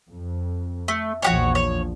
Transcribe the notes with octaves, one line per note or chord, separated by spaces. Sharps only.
F2
A3
A#1 E2 F3 F#4 G4 C#5
C#5